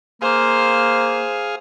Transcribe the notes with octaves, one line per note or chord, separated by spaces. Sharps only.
A#3 G#4 C5 F5